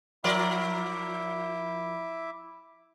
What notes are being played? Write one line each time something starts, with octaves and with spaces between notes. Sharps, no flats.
F3 E4 A#4 D5 E5 D6